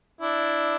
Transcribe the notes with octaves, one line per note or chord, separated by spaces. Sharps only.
D4 E4